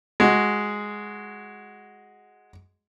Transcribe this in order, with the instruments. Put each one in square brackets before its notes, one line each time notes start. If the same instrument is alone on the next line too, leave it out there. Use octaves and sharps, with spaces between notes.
[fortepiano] G#3 F#4